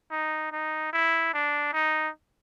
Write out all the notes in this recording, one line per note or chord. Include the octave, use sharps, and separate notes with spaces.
D#4
D#4
E4
D4
D#4